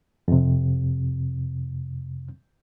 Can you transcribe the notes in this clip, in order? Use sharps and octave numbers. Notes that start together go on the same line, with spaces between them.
F2 C3